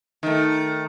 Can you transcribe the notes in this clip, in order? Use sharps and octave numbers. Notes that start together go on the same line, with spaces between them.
D#3 A3